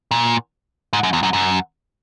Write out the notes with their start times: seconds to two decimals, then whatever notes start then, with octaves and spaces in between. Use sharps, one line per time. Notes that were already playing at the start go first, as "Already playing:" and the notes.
0.11 A#2
0.93 G#2
1.03 F#2
1.13 E2
1.23 F#2
1.33 F#2